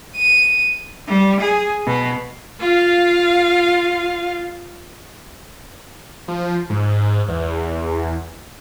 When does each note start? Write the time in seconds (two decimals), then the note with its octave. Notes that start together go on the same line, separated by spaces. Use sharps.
0.16 D#7
1.07 G3
1.40 G#4
1.86 B2
2.60 F4 F5
6.28 F3
6.70 G#2
7.28 E2